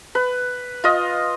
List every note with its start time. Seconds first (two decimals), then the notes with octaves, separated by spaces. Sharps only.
0.15 B4
0.84 F4 D#5